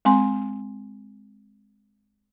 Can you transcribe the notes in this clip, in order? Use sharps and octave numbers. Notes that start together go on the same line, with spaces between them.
G#3 C4 G#5 C6